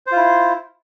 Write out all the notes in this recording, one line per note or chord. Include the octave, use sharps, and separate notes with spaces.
E4 F4 C5